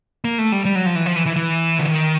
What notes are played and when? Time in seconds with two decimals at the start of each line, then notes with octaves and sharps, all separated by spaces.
0.25 A#3
0.38 A3
0.52 G3
0.65 G3
0.75 F#3
0.86 F3
0.96 E3
1.06 F3
1.16 E3
1.26 E3
1.36 E3
1.79 D3
1.87 D#3